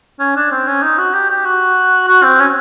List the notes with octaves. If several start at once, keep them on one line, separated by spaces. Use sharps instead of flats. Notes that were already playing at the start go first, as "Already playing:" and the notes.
C#4
D4
C4
C#4
D#4
F#4
G4
G4
F#4
F#4
C4
C#4